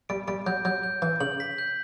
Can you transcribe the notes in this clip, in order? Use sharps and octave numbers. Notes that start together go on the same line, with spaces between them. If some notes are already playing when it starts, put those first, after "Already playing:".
G3 D7
G3 D7
F#3 G6
F#3 G6
G6
E3 G6
C#3 F#7
B6
G6